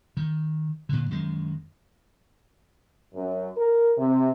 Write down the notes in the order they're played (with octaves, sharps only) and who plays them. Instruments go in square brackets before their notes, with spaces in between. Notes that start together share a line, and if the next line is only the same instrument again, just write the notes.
[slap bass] D#3
A#2 D3
F#2 D#3 G#3
[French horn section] F#2
A#4
C3